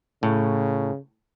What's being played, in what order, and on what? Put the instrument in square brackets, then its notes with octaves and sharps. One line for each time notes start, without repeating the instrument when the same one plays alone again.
[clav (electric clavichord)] A2 [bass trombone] C#3